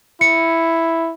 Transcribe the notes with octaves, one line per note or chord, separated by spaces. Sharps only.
E4 C#7